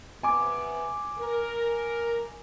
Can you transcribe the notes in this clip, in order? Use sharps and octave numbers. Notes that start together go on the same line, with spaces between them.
C3 B3 G#5 D6
A#4